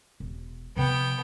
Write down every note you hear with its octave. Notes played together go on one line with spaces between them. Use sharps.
E1
C3 F3 B3 G5